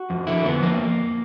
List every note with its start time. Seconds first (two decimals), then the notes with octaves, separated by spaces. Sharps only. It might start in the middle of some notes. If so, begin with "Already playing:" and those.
Already playing: F#4
0.10 F2
0.27 D3 E4
0.45 F2 B3
0.62 F2 A#3